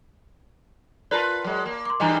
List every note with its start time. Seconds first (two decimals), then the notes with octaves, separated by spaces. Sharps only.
1.11 F4 A#4 B4 D5 A5
1.45 F#3 G#3
1.65 A#3
1.85 C6 D6
2.00 G2 E3 G3 D#5 G#5 A#5